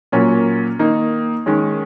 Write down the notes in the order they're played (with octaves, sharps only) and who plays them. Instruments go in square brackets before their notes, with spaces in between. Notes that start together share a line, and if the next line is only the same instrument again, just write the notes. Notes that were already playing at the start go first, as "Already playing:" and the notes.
[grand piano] A#2 F#3 A#3 C#4
D#3 A#3 D#4
D#3 G#3 C#4